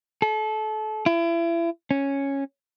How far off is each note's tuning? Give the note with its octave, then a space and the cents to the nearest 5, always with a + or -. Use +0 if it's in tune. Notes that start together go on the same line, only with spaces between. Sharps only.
A4 -30
E4 +35
C#4 -5